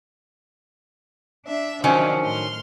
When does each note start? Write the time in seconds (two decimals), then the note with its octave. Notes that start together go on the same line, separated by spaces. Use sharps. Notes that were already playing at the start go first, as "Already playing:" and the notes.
1.45 D4 E5
1.84 D#3 F3 F#3 C#4 D4
2.23 A2 C6 F6